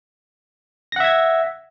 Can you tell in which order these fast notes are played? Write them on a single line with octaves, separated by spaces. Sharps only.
A#6 F#5 E5 G#6